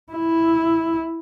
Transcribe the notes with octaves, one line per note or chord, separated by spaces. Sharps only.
E4